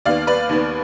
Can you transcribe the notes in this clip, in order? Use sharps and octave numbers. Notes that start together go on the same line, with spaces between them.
D#2 D#3 B3 D5 F5
B4 D5
D#2 D#3 B3